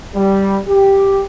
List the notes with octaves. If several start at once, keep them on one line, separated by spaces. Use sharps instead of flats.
G3
G4